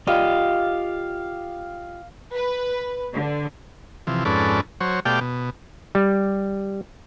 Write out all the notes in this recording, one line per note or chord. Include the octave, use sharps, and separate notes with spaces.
F4 G4 D#5 F5
B4
D3
C3 E3 F3
F2 G#2 C#4 A4 B4 D5
F#3 C5 C#5
B2 A3 G4 D5 F5 G5
B2
G3